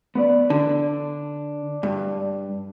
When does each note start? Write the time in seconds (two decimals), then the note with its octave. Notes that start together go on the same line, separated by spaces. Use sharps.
0.15 B3 B4 D5
0.50 D3 D4
1.83 G2